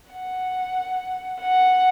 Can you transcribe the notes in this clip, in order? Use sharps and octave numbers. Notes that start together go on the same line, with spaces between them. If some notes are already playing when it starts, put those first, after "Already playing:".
F#5
F#5